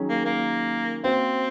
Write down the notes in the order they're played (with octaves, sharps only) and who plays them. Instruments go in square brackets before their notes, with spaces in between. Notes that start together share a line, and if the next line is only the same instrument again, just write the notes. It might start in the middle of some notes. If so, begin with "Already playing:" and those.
Already playing: [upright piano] D#3 F#3 C#4 G#4
[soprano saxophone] A#3
A#3
[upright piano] A#3 C#4 F#4 C5 F5 [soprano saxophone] C4